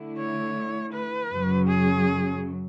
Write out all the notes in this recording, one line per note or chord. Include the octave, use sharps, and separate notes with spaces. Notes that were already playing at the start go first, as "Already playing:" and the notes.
Already playing: D3 A3 E4
C#5
B4
F#2 C#3 F#3
G#4